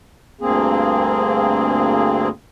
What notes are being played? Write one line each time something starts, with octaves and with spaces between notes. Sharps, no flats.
D2 G2 A#3 C4 G#4